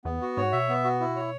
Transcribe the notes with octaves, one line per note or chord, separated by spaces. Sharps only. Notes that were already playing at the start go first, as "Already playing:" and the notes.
E2 B3
F#4
G#2 C#5
B2 E5
B3
F#4
E4
C#5